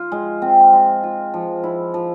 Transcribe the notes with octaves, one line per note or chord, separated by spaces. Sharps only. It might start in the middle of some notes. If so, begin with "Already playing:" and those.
Already playing: F4
G#3
C4
G#3
F4
F3
E4
F3